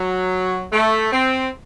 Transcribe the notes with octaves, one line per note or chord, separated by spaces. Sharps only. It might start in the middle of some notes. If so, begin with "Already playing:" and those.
Already playing: F#3
A3
C4